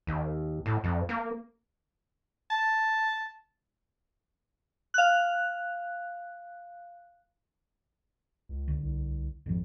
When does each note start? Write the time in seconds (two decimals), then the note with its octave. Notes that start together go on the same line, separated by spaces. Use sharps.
0.07 D#2
0.66 A2
0.84 F2
1.09 A#3
2.50 A5
4.94 F5 F#6
8.49 C#2
8.68 D2
8.82 C2
9.46 G#1 F2 F3